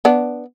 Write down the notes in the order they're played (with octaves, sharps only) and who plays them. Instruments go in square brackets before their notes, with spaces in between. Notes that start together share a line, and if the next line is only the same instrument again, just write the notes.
[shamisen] B3 D4